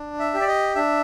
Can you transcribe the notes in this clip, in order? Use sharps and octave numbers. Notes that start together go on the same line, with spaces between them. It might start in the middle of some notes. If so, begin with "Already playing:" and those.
Already playing: D4
E5
G4
D5
D#5
D4 E5